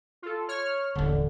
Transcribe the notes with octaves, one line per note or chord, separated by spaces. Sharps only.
F4 A4
C#5 F6
D#1 A1 D3